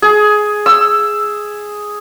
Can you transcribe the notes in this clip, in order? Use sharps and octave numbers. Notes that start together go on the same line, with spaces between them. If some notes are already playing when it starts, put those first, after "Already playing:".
G#4
E6